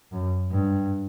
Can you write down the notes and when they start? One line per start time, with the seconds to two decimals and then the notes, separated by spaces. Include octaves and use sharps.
0.12 F#2
0.51 G2